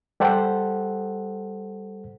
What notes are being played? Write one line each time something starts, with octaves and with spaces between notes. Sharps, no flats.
G3 G4 A4 C5 F#5